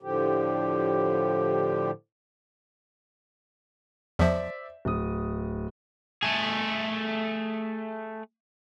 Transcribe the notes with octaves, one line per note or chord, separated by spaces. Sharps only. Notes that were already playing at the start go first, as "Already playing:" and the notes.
A2 D3 F3 G4
E2 F3 C5 D5 E5
D1 D#6
A3 G#4